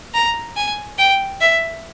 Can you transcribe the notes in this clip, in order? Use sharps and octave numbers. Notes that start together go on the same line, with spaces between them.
A#5
G#5
G5
E5